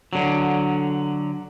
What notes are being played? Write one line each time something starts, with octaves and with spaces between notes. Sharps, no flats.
D3 F#3